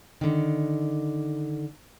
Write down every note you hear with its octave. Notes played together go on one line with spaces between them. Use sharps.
D3 D#3